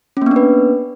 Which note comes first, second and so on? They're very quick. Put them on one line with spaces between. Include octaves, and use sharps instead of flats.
C#4 A#3 B3 D4 B4